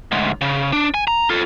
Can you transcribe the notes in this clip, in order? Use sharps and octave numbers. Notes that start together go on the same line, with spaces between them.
D2 G#2
C#3
D4
G#5
A#5
F4 A4